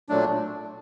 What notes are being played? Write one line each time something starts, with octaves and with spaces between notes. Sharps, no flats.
A#2 F#3 A3 D4